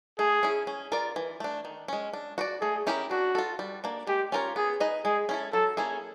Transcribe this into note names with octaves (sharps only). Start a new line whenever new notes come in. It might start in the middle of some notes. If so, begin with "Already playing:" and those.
A3 G#4
C#4 E4
C#4
F4 A#4 D5
E3
A3 D4
D#3
G#3 C#4
D4
F#4 B4 D5
A3 G#4
C#4 E4 G4 A#4
D4 F#4
F4 A4
G3
A#3 D4
G#3 G4
C#4 F4 A#4 C#5
B3 G#4
D#4 G#4 B4 D#5
G#3 G#4
C#4 E4 A4
F#3 A4
A#3 C#4 E4 G#4